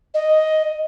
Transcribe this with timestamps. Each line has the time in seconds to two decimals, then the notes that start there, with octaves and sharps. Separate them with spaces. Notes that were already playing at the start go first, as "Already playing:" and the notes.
0.14 D#5